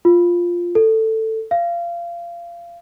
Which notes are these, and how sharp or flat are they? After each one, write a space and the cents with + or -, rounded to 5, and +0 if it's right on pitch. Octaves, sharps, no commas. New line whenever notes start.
F4 +0
A4 +10
F5 -25